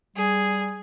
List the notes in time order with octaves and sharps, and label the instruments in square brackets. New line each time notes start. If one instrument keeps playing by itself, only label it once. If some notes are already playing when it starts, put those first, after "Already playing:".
[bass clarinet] G3 [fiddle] G#4